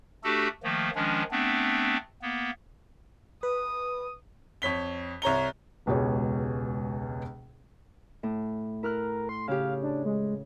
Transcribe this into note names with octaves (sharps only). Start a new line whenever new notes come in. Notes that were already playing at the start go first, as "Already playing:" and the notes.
A3 D4 F#4 G4 A4
D#3 F3 A3 A#3
D#3 F3 G#3 C#4 D4
A3 B3 C4 D4
A#3 B3
B4 D#6
F2 C#5 B6 G7
C2 C#5 A#5 G7
E1 C#2 B2 G4 G#4 C#5
A2
E4 A#4 F6 F#6
C6
C#3 G4 F5
D4
G#3